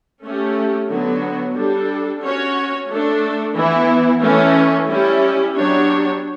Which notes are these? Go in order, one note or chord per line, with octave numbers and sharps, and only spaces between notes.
A3 C#4 G4
D3 F#3 B3 F#4
G3 D4 A4
C#4 F#4 C#5
A3 D4 A4
E3 B3 E4
E3 A3 C#4
G3 C#4 E4
F#3 B3 D4 G4 C#5